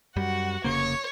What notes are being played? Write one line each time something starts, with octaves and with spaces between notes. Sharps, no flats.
F#2 G3 F#4 F#5
F1 C#3 A#3 C#5